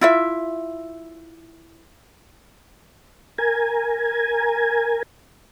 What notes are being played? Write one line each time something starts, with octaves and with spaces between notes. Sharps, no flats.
E4 F4 E5
A#4 G#5